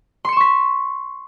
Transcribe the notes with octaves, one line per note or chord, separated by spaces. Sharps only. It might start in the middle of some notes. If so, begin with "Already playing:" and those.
C6 C#6 B6 C#7 E7